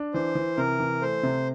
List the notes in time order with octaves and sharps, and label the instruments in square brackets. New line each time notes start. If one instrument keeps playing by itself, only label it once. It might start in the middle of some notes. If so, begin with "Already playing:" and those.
Already playing: [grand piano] D4
[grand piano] E3 [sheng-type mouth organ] C5
[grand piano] E3
[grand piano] C3 [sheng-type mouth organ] A#4
[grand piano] E3
[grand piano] A3 [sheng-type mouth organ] C5
[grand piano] C3